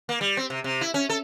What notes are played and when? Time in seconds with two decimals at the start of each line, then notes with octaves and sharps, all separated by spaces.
0.09 A#3
0.21 G3
0.37 C4
0.50 C3
0.64 C3
0.81 E4
0.94 C#4
1.10 A4